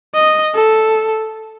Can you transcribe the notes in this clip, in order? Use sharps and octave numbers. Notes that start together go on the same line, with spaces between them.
D#5
A4